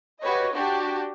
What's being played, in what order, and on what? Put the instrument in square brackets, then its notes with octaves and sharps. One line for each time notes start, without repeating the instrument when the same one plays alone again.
[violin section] F#4 G4 B4 C#5 D#5
D4 F#4 G4